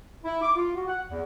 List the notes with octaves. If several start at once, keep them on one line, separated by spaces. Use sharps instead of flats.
E4
D6
F4
F#4
F#5
E2